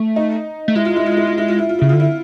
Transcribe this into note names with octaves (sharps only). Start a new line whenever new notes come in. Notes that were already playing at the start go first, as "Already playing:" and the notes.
Already playing: A3
D#4
A3
G#3 E4
F4
E4
F4
E4
F4
E4
F4
E4
F4
C#3 E4
D3 F4
E4